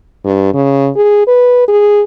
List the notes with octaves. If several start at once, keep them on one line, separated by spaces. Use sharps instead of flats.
G2
C#3
G#4
B4
G#4